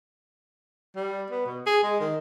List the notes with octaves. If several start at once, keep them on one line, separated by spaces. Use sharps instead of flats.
G3
B3
B2
G#4
G#3
D#3